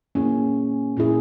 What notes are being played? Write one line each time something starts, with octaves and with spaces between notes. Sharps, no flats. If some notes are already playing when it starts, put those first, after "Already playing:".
A#2 A#3 C#4 E4 G#4
A#2 A#3 C#4 E4 G#4